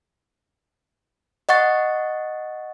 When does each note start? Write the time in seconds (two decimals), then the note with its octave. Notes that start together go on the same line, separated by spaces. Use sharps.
1.49 D#5 F#5 C#6 A6